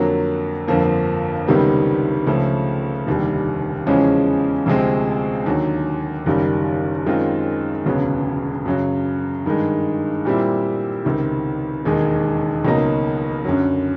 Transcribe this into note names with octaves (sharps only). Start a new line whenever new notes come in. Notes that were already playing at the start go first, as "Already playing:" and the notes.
Already playing: F2 D3 F#3 A#3
G1 F2 D3 F3 A#3
C#2 C3 D#3 G3 B3
C#2 C#3 F3 A3 C#4
F1 D#2 D3 G3
E2 C#3 F3 G#3 C#4
D2 C3 F3 G#3 C4
D#2 D3 F#3
F#1 F#2 D#3 G3
F#2 D#3 G#3 C4 F4
E1 D2 C#3 F#3 B3
F#2 C#3 F#3
G2 D#3 G#3
A#2 G3 C4 E4
C#2 C3 D#3
E1 D#2 D#3 G#3
C#2 B2 F#3 A#3 D#4
F#2 D3 F#3